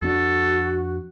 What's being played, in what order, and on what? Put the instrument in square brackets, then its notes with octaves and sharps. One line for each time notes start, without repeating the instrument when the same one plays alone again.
[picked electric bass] F2 C#4 D4 [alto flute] F#4 [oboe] A4